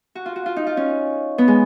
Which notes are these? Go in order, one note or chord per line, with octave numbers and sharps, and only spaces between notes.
F#4
F4
F#4
F4
D#4
F4
C#4
B3
G#3